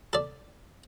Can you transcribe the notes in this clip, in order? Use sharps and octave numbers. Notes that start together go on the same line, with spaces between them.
A4 D5